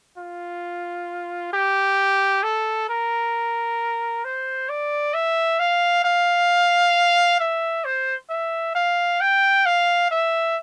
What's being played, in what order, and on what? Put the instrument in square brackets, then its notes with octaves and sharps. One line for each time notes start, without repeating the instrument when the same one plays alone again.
[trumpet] F4
G4
A4
A#4
C5
D5
E5
F5
F5
E5
C5
E5
F5
G5
F5
E5